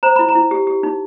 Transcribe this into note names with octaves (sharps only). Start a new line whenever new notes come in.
C5 A#5
E4 B5
A#5
E4
G4
G4
D#4